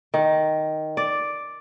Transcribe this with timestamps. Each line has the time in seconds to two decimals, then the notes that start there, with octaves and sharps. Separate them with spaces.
0.14 D#3
0.97 D5